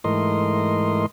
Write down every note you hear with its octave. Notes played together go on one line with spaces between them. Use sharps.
G#2 E3 A3 A#4 D#5 C6